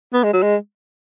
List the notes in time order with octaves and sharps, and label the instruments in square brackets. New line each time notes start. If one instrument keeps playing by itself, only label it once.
[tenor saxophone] B3
G#3
F#3
G#3